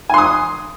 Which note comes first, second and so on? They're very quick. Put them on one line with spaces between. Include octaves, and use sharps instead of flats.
G#5 C6 D#6